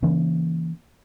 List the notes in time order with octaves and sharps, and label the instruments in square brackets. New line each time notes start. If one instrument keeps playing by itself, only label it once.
[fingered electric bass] C#3 E3 A#3 C#4